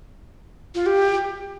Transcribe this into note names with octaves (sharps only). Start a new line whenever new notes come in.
F4
G4